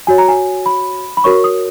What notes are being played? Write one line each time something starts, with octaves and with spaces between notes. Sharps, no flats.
F#4 C#5 G#5
A#5
G#5
B5
B5
F#4 A#4 C#5 C#6
D#6